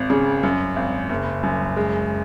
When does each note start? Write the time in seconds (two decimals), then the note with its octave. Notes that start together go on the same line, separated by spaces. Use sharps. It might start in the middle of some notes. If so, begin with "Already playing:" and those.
Already playing: G#1
0.10 C#3
0.43 F#2
0.76 G#1
1.09 F#1
1.43 F#2
1.76 G#3